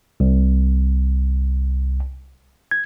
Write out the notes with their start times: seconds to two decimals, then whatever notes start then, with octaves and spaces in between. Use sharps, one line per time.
0.20 C2
2.71 G#6